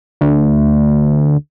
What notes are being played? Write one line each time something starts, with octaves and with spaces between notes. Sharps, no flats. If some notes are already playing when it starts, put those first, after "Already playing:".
D2